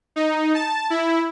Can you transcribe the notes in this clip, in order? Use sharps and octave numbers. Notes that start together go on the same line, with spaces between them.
D#4
A5
E4